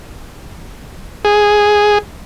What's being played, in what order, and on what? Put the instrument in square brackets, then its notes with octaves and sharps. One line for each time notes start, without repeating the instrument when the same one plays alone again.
[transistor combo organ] G#4